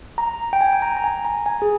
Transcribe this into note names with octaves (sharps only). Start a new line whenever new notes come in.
A#5
G5
G#5
G#5
A#5
A#5
G#5
A#5
G#5
G#4